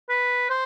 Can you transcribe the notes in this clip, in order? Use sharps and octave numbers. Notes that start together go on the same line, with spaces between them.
B4
C5